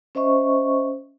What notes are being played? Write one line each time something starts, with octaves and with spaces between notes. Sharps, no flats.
C#4 C5 D#5 E5 C#6